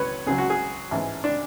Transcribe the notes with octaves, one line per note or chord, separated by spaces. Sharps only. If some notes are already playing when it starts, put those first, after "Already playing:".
Already playing: C#2 F#3 B4 C#5
C#2 C#3 F#3 G#4
F#4
G#4
A1 G#2 E3
D4